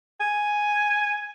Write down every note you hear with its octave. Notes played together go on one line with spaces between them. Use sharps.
G#5